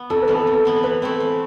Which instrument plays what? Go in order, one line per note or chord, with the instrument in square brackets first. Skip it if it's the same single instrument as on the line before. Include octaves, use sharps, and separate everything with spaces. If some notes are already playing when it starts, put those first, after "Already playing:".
Already playing: [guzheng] B3
[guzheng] F2 [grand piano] A4
[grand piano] B4
[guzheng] E3 B3
[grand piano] A4
[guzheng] F2
E3 B3
[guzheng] E3 [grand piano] B4
[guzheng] A3 C4 E4
E3